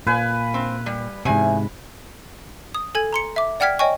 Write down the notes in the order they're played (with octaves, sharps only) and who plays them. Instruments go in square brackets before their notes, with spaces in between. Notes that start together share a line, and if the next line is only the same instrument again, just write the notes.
[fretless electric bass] A#2 [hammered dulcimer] B4 F5 G#5
[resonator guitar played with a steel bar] C4
G3
[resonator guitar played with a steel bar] E2 G#5 [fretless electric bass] G#2 C3
[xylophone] D#6
A4 G#5 G#6
A#5 C6 C#7
E5 D6
D5 F#5 G5 F6 G#6 B6
C#5 D#5 G5 G#5 C#6